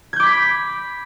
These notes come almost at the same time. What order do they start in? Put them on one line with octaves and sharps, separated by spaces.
G#6 G6 D6 B5 B6